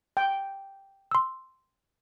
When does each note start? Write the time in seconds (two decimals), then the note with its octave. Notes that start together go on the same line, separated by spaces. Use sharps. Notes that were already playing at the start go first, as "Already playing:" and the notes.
0.17 G5
1.11 C6 E6